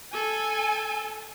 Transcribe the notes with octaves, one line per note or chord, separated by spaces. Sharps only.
A4 G#5